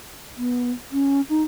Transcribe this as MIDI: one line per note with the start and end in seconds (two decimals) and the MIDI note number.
0.37 0.70 59
0.92 1.21 61
1.29 1.43 63